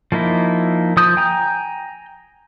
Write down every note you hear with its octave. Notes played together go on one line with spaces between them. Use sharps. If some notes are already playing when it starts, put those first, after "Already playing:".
F3 A#3 D#4 E4
F3 D#6 G6
G5 G#5 A#5 G6